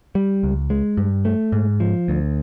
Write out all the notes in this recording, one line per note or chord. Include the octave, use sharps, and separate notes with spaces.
G3
C#2
G#3
G2
A3
G#2
F3
D2